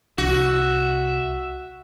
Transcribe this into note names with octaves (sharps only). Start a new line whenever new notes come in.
C2 F#4 E5